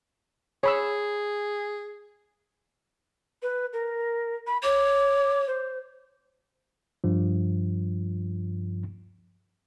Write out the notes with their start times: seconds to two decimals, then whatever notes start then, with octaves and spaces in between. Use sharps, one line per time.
0.63 G#4 C#5 B5 E6
3.42 B4
3.73 A#4
4.47 B5
4.63 C#5 D6
5.47 C5
7.04 G2 F3